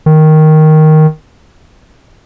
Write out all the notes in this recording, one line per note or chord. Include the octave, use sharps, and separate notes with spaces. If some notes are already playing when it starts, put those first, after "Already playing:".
D#3